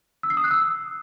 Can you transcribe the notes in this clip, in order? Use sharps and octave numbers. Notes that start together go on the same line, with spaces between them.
E6
C7
D#6
F#6
E6